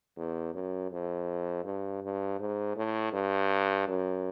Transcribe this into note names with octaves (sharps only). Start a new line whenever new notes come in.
E2
F#2
F2
G2
G2
G#2
A2
G2
F#2